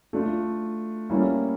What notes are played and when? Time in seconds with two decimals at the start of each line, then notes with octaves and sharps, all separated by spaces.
0.13 A3 D4 F4
1.10 G3 A#3 C#4 E4